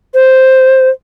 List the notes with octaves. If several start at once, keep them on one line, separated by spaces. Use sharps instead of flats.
C5